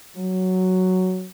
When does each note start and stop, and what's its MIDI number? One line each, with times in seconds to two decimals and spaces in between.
0.17 1.27 54